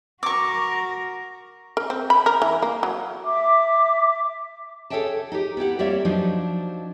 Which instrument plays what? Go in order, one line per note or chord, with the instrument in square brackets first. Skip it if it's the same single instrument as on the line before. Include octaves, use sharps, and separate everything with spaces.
[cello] F#4 A#4 [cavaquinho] C#6 D6
[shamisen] A#4
C4
B5
A#4
E3
A#3
F#3
[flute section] E5 D6
[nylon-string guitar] G#4 A4 C#5 E5 G5 A5
D#4 G4
B3 E4 G4 F#5
G3 A#3 C4 C#5 D5 E5
F3 F#3 D4 D#4 C5